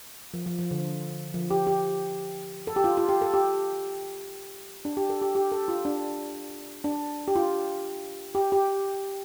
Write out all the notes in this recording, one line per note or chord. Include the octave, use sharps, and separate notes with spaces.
F3
F3
F3
D3
F3
G4
G4
A4
G4
F4
F4
G4
A4
G4
D4
G4
A4
G4
G4
A4
F4
D4
D4
G4
F4
G4
G4